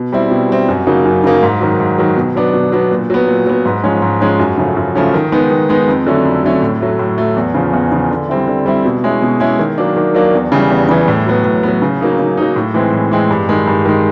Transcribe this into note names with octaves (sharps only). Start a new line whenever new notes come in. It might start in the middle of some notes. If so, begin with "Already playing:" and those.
Already playing: B2
G3 C4 E4
B2
G3 C4 E4
F#2
C#3 F#3 A#3 D#4
F#2
C#3 F#3 A#3 D#4
G#2
D#3 F#3
G#2
D#3 F#3
B2
F#3 B3 D4
B2
F#3 B3 D4
A#2
F#3 B3
A#2
F#3 B3
G#2
F3 G#3 C#4
G#2
F3 G#3 C#4
F#2
C#3 F3 A3 C#4
F#2
C#3 F3 A3 C#4
D#3
G#3 B3 D#4
D#3
G#3 B3 D#4
F2
D3 F#3 A3 C#4
F2
D3 F#3 A3 C#4
A2
F#3 A3
A2
F#3 A3
E2
C#3 F3
E2
C#3 F3
D3
G3 C4 E4
D3
G3 C4 E4
B2
G#3 C#4 E4
B2
G#3 C#4 E4
D#3
F#3 A#3 D4
D#3
F#3 A#3 D4
E2
C#3 E3 G3
E2
C#3 E3 G3
A2
F#3 B3
A2
F#3 B3
C#3
F#3 A#3 D#4
C#3
F#3 A#3 D#4
A2
E3 G#3 C4
A2
E3 G#3 C4
G2
D#3 G#3
G2
D#3 G#3